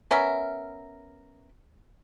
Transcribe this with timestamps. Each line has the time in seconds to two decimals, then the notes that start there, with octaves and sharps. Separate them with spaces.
0.11 B3 C#4 A#4 E5